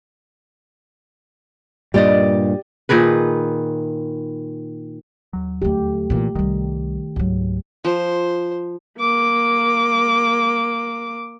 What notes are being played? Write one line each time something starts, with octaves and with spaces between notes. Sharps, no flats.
G2 A#2 G3 G4 D5 D#5
A#2 D#3 G#4 B4
D#2 F#3
D2 D3 A3 G4
A#2 E3
C2 D#3 G3
C#2 G#2 F#3
F3 C5
A#3 D6